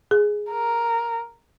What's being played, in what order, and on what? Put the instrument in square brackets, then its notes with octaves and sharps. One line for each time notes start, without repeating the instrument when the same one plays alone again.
[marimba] G#4
[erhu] A#4